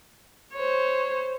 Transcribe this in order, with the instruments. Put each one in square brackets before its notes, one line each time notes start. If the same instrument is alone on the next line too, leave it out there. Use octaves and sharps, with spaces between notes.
[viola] C5 C#5